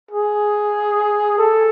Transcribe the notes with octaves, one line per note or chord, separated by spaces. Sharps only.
G#4
A4